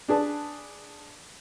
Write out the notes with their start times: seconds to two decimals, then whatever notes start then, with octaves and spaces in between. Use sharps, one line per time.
0.08 D4 G#4 B4 A5